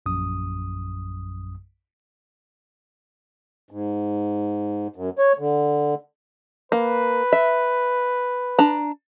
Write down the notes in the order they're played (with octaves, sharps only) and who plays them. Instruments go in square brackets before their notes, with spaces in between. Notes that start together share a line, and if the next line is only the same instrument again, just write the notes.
[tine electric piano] A#1 F#2 D#6
[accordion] G#2
F#2
C#5
D3
[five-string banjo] A#3 [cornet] B4
[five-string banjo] E5
D4 A#5